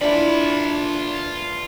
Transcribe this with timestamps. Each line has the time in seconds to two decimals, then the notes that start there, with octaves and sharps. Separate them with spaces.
0.01 A#2 D3 E3 D4 F4 D5 A5 B5